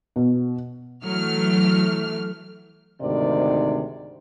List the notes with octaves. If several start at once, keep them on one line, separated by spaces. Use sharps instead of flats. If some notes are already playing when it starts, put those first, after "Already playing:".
B2
E3 F#3 A3 F6
D2 G#2 C3 D#3 D5